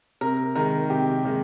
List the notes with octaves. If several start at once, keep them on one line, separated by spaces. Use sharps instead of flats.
C3 A#4
D#3 G#3 A#4
C3 G4
D#3 G#3